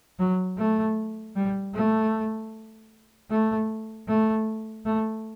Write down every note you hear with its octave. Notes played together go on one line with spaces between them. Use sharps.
F#3
A3
G3
A3
A3
A3
A3